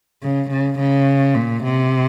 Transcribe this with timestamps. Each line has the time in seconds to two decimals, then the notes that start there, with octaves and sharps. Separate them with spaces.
0.23 C#3
0.50 C#3
0.79 C#3
1.35 A#2
1.64 C3